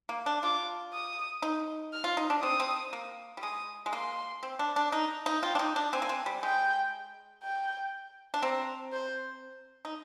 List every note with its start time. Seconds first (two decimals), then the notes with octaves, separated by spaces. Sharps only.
0.09 A#3
0.26 D4
0.43 F4 D6
0.93 D#6
1.42 D#4
1.93 F6
2.04 F4
2.17 D#4
2.30 D4
2.42 C4 D#6
2.60 C4
2.93 A#3
3.37 G3
3.42 G#3 D#6
3.86 G#3
3.93 A#3 C6
4.43 C4
4.59 D4
4.76 D4
4.92 D#4 A#5
5.26 D#4
5.43 F4 G5
5.55 D4
5.59 D#4
5.76 D4
5.92 C4 G#5
6.02 A#3
6.09 C4
6.26 G3
6.43 G#3 G5
7.43 G5
8.34 D4
8.42 C4 A#5
8.93 C5
9.85 D#4